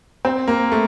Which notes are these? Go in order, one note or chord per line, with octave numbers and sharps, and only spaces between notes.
C4
A#3
A3